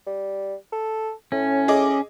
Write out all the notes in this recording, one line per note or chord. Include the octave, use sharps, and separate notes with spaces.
G3
A4
A2 C#4
G#4 D#5 D6